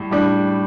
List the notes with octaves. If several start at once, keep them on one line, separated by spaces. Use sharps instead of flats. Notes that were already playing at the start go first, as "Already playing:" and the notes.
Already playing: A2 G3
A2 G3 D4